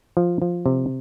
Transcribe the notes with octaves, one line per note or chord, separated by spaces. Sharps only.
F3
F3
C3